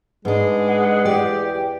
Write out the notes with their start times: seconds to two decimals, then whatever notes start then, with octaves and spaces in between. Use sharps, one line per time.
0.25 G#2 G#3 B3 D4
0.68 F#5
1.05 E2 G4 D5